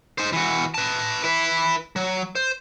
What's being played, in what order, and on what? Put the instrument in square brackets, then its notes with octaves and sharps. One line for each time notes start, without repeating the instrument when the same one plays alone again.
[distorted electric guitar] D#4 C5
E3 F#4
B4 A5
E4 B4
F#3
C5